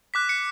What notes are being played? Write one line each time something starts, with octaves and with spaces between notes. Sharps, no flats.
D6 F#6 B6
C#7